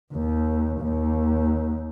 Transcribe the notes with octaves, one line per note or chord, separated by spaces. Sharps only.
D#2
D#2